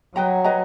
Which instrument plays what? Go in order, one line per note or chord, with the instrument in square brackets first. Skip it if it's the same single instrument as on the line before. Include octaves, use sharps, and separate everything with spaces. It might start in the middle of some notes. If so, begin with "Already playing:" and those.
[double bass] F#3 [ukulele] B4 D#5 G5 A#5
[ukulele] B4 D#5 G5 A#5